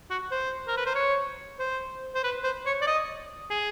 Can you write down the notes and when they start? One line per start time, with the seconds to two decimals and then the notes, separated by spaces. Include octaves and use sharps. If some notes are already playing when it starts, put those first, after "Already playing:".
0.10 F#4
0.31 C5
0.68 A#4
0.77 B4
0.86 C5
0.95 C#5
1.59 C5
2.15 C5
2.24 B4
2.44 C5
2.66 C#5
2.82 D5
2.87 D#5
3.50 G#4